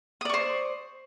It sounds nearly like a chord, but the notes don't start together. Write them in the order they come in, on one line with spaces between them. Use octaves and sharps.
D#6 D5 C#6 C5